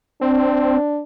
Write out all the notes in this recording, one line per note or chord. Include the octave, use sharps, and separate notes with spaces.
C4 D4